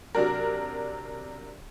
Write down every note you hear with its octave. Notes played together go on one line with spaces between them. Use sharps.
C3 F#3 D4 A#4